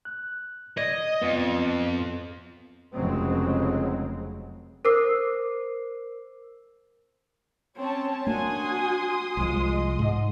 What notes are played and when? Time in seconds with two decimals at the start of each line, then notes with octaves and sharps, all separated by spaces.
0.05 F#6
0.78 D5 D#5 G#6
1.22 F2 B3
2.93 F1 F2 C#3 F#3 G#3 C4
4.85 A#4 C5 D6 E6 C7
7.77 C4 C#4 C#5 A5
8.27 A#3 D4 F#4 G#5 C6 D#6
9.37 C2 F3 G#3
9.68 D#5
9.99 G#2